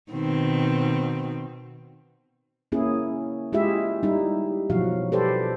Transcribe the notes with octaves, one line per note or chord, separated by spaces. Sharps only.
B2 D#3 C4
A#3 C#4 E4 G#4
G#3 E4 F4 G4 G#4 E5
G3 D#4 E4
B2 F3 F#3 F#4 F5
G4 A4 B4 C5 D5